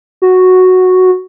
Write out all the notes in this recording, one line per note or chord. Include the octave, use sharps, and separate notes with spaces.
F#4